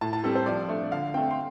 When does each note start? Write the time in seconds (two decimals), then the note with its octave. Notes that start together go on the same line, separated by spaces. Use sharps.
0.01 A2 A5
0.13 A5
0.24 G3 C4 A4
0.35 C5
0.46 F3 D5
0.68 A3 D4
0.91 D3 F5
1.14 A3 C4 G5
1.31 C6